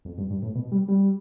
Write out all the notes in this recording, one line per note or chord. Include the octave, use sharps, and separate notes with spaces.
F2
G2
G2
A2
B2
G3
G3